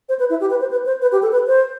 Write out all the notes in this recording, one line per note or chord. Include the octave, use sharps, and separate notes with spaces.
C5
B4
E4
G4
B4
C5
B4
C5
B4
G4
A4
B4
C5